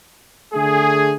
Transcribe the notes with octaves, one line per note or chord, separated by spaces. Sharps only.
D3 A3 G#4